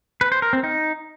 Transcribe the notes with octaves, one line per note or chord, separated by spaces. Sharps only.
B4
C5
A#4
C4
D#4